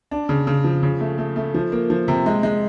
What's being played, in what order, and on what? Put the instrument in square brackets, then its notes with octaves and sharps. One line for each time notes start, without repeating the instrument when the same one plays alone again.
[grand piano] D4
C#3
C#3
F3
C#3
A3
A3
A3
F3
A#3
F3
C3
G#3
G#3